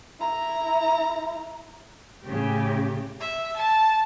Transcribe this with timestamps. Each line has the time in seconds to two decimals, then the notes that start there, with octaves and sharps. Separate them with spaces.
0.20 E4 A#5
2.25 A2 C#3 G4
3.20 E5
3.57 A5